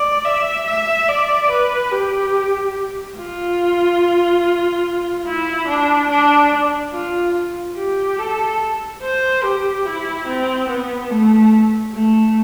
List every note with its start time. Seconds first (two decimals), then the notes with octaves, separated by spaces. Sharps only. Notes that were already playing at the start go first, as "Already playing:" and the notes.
Already playing: D5
0.25 E5
0.67 E5
1.09 D5
1.51 B4
1.92 G4
3.17 F4
5.26 E4
5.68 D4
6.10 D4
6.93 F4
7.77 G4
8.18 A4
9.02 C5
9.43 G4
9.85 E4
10.27 C4
10.69 B3
11.11 A3
11.94 A3